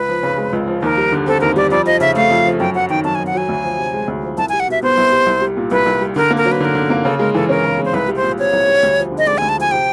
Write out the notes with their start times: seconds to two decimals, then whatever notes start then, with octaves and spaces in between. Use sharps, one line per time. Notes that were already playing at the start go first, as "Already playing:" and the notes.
Already playing: C#2 B4
0.09 F3
0.23 C#3
0.38 G#3
0.53 C#2
0.68 F3
0.82 D#2 A#4
0.97 G3
1.12 D3
1.26 C4 A4
1.41 D#2 A#4
1.56 G3 D5
1.71 F2 D5
1.86 F3 D#5
2.00 C#3 E5
2.15 A3 F5
2.31 F2
2.45 F3
2.60 F#2 G5
2.75 F#3 F#5
2.90 D#3 G5
3.05 F#2 A5
3.15 G#5
3.20 F#2
3.27 F#5
3.35 F#3 G#5
3.49 D2
3.64 F3
3.79 C3
3.94 G#3
4.08 D2
4.23 F3
4.38 C2 A5
4.49 G#5
4.53 G3
4.60 F#5
4.68 B2 E5
4.83 B3 C5
4.98 C2
5.12 G3
5.27 C2
5.41 G3
5.57 A#2
5.71 C2 B4
5.86 C2
6.01 G3
6.16 D3 A#4
6.31 A#3
6.37 A#4
6.45 F#3
6.52 B4
6.60 D3 A#4
6.75 D3
6.90 A#3
7.04 C#3 A4
7.19 G#3 A#4
7.34 E3 A4
7.49 C#4 A#4
7.64 C#3
7.79 G#3
7.85 C5
7.93 C2 B4
8.08 G3
8.16 C5
8.23 A#2
8.38 C4 C#5
8.53 C2
8.68 G3
8.83 D2
8.98 F3
9.12 D3
9.18 D#5
9.27 G#3 D5
9.38 G#5
9.42 D2
9.49 A5
9.57 F3 G#5
9.71 C3 G5